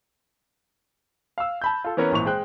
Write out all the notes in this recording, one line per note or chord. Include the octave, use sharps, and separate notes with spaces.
F5 E6
A5 B5 G6
F4 A4
E3 B3 C#4 A#4 C#5
G#1 A#2 E3 C#6 F7
G#3 C5 G5 F#6